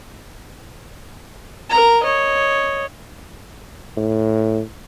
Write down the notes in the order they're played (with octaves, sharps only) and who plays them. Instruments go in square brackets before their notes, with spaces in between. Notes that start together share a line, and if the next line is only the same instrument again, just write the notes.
[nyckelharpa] A#4 A#5
C#5 D#5
[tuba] A2